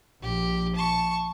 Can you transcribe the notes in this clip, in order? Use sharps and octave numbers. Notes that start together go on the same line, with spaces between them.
A#1 G4
A5 C#6